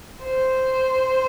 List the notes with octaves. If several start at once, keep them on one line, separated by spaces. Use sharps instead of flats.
C5